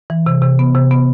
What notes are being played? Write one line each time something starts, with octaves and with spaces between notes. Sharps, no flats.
E3
C3
C3
B3
C3
B3